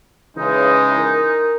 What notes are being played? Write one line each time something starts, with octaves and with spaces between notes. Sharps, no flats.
C#3 E3 G#3 D#4
A#4